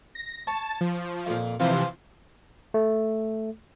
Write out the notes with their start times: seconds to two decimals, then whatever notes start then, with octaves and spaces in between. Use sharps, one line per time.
0.15 A#6
0.47 C#5 A5
0.81 F3
1.26 F2 A#2
1.60 C3 E3 F3 F4 C5
2.74 A3